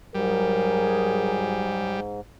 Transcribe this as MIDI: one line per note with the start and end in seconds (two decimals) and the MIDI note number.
0.15 2.21 44
0.15 1.97 54
0.15 2.00 55
0.15 1.97 68
0.15 1.50 70